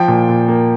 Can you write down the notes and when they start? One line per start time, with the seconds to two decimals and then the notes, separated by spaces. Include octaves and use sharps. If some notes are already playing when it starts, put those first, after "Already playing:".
Already playing: F3 G5
0.08 A#2
0.29 A#2
0.48 A#3